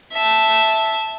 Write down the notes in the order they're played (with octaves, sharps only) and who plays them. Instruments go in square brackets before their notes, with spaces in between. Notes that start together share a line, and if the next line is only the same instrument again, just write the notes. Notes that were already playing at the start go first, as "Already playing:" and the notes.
[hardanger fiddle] E5 A5